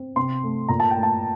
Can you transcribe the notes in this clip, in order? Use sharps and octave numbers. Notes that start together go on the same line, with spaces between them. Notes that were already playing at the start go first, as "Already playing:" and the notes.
Already playing: C4
C3 C6
A3
A#2 A#5
A5
A3 G5
A5